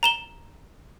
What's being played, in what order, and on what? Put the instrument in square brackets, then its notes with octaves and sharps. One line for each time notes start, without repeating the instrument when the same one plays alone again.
[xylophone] A#5 E7 G7